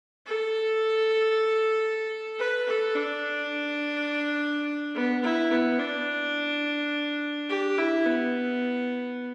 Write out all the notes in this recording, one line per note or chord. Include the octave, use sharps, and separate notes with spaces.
A4
B4
A4
D4
B3
E4
B3
D4
G4
E4
B3